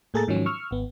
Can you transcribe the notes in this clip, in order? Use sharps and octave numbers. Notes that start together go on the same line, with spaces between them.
A2 A#3 G#4 A4 A#5 A6
G#2 D#3 F3 F#3 C#4
C#6 E6 F6
G#1 B3